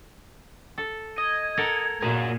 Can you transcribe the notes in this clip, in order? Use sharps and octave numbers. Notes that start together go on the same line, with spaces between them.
A4
D#5 G#6
A4 A#4 F#5
A#2 F#4 G#4 A#4